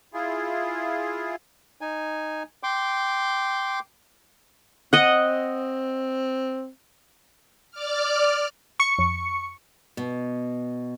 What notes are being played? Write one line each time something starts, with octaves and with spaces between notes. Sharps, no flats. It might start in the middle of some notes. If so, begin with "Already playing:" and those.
E4 F4 G#4
D#4 G#5
G5 C6 D6
C4 D#5 F#5
D5 D6 F6
C#6 C#7
F2
B2